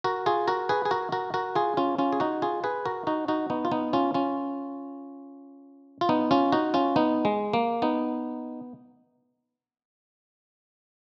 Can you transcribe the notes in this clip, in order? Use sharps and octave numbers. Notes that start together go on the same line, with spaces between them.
F#4 A#4
F4 G#4
F#4 A#4
G#4 B4
G#4
F#4 A#4
F#4 A#4
F#4 A#4
F4 G#4
C#4 F4
C#4 F4
G#4
D#4 F#4
F4 G#4
G#4 B4
F#4 A#4
D#4 F#4
D#4 F#4
B3 D#4
F4
B3 D#4
C#4 F4
C#4 F4
F4
B3 D#4
C#4 F4
D#4 F#4
C#4 F4
B3 D#4
G#3
A#3
B3 D#4